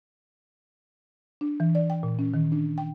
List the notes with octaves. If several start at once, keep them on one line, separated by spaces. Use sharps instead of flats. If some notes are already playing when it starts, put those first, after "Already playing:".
D4
E3
D5
G5
A#2
C#4
D#3
D4
G5